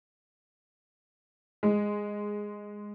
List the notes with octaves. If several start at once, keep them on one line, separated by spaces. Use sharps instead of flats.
G#3